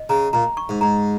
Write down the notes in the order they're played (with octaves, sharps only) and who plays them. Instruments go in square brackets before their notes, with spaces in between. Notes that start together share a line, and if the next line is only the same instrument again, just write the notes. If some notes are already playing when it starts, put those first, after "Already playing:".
Already playing: [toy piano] D#5
[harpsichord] C#3 [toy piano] A#5
[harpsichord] A#2 [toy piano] A#5
[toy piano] C#6
[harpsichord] G#2
[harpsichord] G#2 [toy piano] A#5